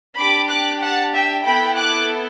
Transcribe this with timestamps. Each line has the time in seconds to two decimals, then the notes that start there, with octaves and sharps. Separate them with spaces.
0.17 D4 G4 B5 D6
0.50 D6 F#6
0.81 F#5 A5
1.13 E5 G5
1.45 B3 E4 A4 G5 B5
1.77 D6 F#6